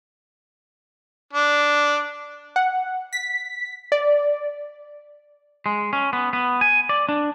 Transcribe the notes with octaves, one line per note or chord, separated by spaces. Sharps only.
D4
F#5
B6
D5
G#3
C#4
B3
B3
G#5
D5
D4